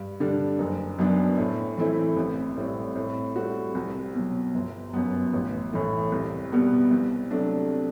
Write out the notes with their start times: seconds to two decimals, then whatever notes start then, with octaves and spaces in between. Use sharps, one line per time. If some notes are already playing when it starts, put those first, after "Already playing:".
Already playing: G2
0.20 D3 G3 D4
0.59 F#1
0.99 F#2 F#3 B3 D4
1.37 A2
1.77 E3 A3 C4 E4
2.16 A1
2.56 A2 G3 C4
2.95 A2
3.36 G3 C4 F#4 A4
3.75 C2
4.14 B2 F#3
4.55 G1
4.94 F#2 F#3 B3
5.33 A1
5.73 A2 E3 A3
6.12 C2
6.52 B2 G3 B3
6.91 C2
7.31 C3 F#3 A3 D4